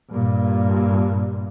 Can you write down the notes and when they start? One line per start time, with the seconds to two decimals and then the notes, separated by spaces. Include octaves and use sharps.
0.11 G2 A#2